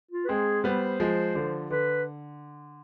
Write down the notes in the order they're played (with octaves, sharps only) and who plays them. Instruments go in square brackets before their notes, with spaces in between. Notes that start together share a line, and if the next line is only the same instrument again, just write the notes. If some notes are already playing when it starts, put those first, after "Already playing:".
[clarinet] F4
B4
[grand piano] G#3 C4 [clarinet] G#4
[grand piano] G3 B3 [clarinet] C5
[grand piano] F3 G#3
D3 F3
[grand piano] D3 [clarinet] B4